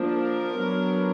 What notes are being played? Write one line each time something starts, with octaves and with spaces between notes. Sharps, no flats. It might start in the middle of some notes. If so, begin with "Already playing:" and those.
Already playing: F3 A#3 D4
A#4
F#3 B3 D4